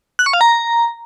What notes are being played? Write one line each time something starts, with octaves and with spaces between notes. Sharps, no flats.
F#6
C#6
F5
A#5